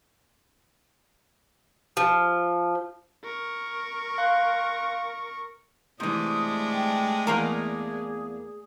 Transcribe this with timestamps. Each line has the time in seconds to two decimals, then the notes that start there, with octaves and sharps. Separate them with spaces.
1.97 F3
3.24 A#4 C#6
4.18 F5 C6 F#6
6.00 C3 E3 G#3 A3 D4 D#6
6.72 G5
7.27 E2 A#3 G#4 A#4